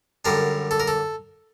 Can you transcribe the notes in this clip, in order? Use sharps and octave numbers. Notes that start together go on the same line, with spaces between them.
F#2 D3 G3 D4 A#4
A4
A#4
A4